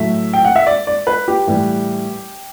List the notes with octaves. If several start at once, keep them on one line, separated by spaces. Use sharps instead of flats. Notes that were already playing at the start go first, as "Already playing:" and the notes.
Already playing: A2 F#3 A3 E5
G5
F#5
E5
D5
D5
B4
G4
A2 E3 G3